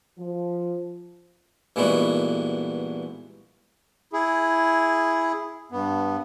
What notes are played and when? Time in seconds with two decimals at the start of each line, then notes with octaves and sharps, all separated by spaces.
0.18 F3
1.76 G2 A#2 E3 G#3 B3 F#4
4.13 E4 G#4
5.72 G2 B3